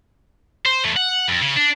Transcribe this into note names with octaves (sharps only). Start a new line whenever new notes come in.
C5
E2 A3
F#5
F2
C#3
D4